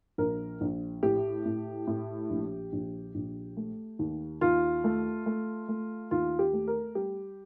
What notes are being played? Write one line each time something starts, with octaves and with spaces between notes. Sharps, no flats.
A#1 A#4
A#1
A2 G4
A2
A2
A#1
A#1
A#1
A3
D#2
D#2 F4
A3
A3
A3
D#2 F4
G4
A3
A#4
G3 G4